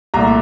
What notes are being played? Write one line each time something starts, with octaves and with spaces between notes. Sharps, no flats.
C2 A#2 A3 A#5